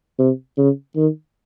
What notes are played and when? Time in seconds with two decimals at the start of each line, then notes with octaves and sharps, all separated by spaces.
0.19 C3
0.58 C#3
0.96 D#3